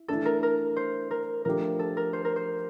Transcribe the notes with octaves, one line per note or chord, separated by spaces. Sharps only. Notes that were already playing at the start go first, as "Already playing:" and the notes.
Already playing: E4
E3 A3 D4 A4
A#4
A#4
C5
A#4
F3 A3 D4 G4 A#4
A4
A#4
C5
A#4
C5